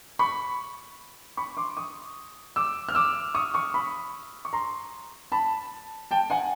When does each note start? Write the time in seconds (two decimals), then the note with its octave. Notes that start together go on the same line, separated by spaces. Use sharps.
0.19 B5 C#6
1.37 B5 C#6
1.57 C6 D6
1.77 C#6 D#6
2.56 D6 E6
2.89 F6
2.95 D6 E6
3.34 C#6 D#6
3.54 C#6 D#6
3.74 B5 C#6
4.45 C#6
4.53 A#5 C6
5.32 A5 B5
6.11 G5 A5
6.30 F#5 G#5